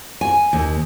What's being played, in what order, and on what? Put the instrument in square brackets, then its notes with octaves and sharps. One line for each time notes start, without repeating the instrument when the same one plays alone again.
[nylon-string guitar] G#5
D#2